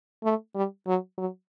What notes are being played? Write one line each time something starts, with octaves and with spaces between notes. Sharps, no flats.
A3
G3
F#3
F#3